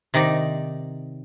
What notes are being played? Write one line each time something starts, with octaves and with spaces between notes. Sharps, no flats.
C3 D#3 D#4 D5